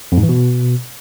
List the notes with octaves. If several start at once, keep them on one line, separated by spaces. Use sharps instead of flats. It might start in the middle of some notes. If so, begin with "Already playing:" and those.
F2
G#2
E3
B2